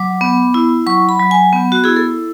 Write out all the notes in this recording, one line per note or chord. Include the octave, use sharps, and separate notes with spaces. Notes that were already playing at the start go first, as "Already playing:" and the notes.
Already playing: F#3 D6
B3
E4
F#3 C#6
B5
F#3
G#5
B3
F#4
E4 G#4
A4